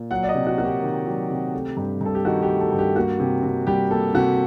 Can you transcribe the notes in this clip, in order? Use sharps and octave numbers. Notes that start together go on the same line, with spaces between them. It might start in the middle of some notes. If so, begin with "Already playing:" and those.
Already playing: A#2
F#3 F#5
D5
D#5
C3
F#4
A#3 F#4
G4
D#3
F#3
C3
A3
G2
G2 A4
G4
D#3 F#4
G4
A3
A4
G2
G4
A#3 F#4
C3
C3
G3 G4
A#3 A4
C3 F#4